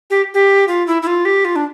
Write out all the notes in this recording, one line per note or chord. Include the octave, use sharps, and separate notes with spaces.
G4
G4
F4
E4
E4
F4
G4
F4
D4